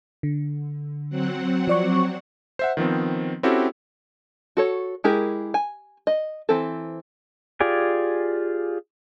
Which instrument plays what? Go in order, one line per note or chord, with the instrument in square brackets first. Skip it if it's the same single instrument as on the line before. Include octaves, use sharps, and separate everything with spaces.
[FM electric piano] D3
[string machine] F#3 C4 F#5
[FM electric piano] F3 D5 C#6
[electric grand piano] C5 E5 F#5
D#3 F3 B3 C4
C4 C#4 E4 F#4 G4 A4
[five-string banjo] F#4 A4 C#5
G#3 E4 G4 G#4 A#4
G#5
D#5
E3 C4 A4
[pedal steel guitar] F4 G4 G#4 D5 G#5